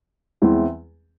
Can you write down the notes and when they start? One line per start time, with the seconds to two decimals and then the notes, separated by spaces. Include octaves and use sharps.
0.42 E2 E3 G#3 C4 E4